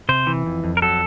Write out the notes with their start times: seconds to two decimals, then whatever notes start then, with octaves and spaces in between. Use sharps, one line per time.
0.09 C3 C5
0.27 E3
0.46 F2
0.64 F2
0.77 A#4
0.82 F#3 A4